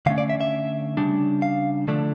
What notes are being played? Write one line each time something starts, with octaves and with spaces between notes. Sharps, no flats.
D3 A3 C#4 F5
D5
E5
E5
C#3 G3 D4
F5
D3 F3 A3 D4